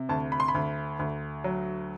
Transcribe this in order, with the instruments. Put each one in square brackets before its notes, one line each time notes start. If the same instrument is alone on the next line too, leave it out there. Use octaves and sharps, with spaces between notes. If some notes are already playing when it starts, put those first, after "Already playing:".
Already playing: [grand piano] C3
D2 A5
B5
C6
B5
D2
D2
F#3